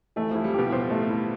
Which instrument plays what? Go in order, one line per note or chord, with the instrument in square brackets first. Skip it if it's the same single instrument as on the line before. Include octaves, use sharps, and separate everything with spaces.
[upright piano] E3 [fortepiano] A3
[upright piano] F3 [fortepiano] E4
[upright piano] G3
[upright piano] B2 [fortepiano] G4
[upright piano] A2
[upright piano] B2 [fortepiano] C5
[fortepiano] A3
E4